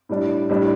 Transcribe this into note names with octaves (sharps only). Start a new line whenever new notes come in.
A2 G3 D4
A2 G3 D4